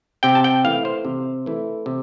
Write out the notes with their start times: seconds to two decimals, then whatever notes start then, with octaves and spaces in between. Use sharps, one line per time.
0.23 C3 G5
0.35 A5
0.44 G5
0.64 E3 A3 E4 F5
0.85 C5
1.05 C3
1.46 E3 A3 E4
1.86 C3